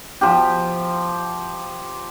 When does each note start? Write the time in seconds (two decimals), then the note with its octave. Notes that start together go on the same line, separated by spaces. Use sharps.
0.21 F3 G4